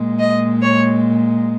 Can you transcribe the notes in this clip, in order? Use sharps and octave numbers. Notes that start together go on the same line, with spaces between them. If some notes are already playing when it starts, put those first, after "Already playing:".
Already playing: A#2 G#3
D#5
C#5